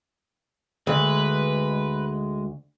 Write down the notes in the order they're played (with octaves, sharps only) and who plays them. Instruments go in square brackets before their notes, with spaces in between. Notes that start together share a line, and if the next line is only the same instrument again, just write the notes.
[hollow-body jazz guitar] D2 [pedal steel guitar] G#3 [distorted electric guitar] B4